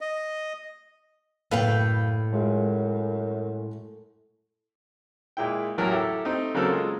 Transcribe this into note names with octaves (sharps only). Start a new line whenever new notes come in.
D#5
F#1 A2 B4 F5 G5
F#2 G#3 F4
A#2 G#3 E4 G5
A1 A2 F#3 E4 A#4 A#5
E4 G4 A4
A3 C4 D#4
C#3 F#3 A#3 C4 A4 A#4
G#3 F4